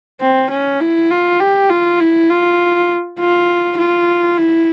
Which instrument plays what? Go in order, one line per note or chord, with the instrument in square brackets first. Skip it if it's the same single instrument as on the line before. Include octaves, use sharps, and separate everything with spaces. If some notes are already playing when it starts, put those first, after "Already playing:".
[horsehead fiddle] C4
C#4
E4
F4
G4
F4
E4
F4
F4
F4
E4